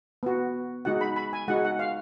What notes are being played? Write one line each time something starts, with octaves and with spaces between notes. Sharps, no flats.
B3 F#4
G#3 D#4 F#4 F#5
B5
B5
G#5
G#3 D#4 F#4 F#5
F#5
F5